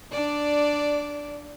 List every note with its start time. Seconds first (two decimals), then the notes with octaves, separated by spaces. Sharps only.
0.12 D4 D5